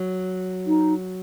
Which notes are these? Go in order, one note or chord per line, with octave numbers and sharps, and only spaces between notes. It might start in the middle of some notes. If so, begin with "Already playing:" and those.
Already playing: F#3
D#4